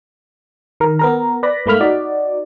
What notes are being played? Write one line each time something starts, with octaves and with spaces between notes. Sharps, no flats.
D#3 A#4
B3 A#4 A#5
B4 D5 B5 A#6
G#2 A3 A#3 B5 F6 B6
D#4 F#4 D5